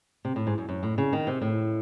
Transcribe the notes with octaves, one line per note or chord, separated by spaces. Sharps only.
C3
A2
G#2
F#2
F#2
A2
C#3
D#3
C3
A2